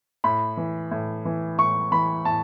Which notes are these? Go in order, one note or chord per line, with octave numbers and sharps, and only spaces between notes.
A2 B5
E3
A2
E3
A2 C#6
E3 B5
A2 A5